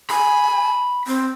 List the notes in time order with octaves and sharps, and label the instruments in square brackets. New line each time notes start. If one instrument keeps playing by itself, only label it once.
[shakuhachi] G#5 [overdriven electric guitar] B5
[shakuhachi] C4